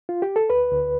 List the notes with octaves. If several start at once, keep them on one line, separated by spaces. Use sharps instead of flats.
F4
G4
A4
D2 B4
D2